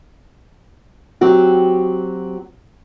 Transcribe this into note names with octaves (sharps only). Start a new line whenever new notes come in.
F#3 C4 F#4 G4